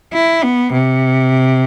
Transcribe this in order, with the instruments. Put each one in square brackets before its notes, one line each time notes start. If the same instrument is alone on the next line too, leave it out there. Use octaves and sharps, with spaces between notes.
[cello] E4
B3
C3